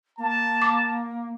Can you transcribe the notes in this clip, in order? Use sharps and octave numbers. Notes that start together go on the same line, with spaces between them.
A#3 A5
D6